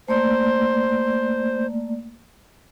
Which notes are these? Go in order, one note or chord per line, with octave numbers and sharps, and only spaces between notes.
A3 A#3 C5 D5